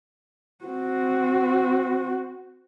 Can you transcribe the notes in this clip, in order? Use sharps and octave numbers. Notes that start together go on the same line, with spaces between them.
C4 F#4